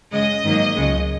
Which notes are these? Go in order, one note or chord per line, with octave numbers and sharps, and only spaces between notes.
F#2 C#3 G#3 D#5
G#2 D#3 F#3 A#3
C#2 C#3 G#3